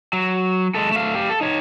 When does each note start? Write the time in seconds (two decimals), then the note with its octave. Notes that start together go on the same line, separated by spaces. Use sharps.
0.13 F#3
0.75 G#3 A4
0.92 A3 F5
1.15 G4 F5
1.30 A4
1.41 D#4 C#5